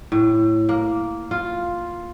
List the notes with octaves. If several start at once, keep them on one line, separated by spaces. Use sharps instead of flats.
A2
A#3
F4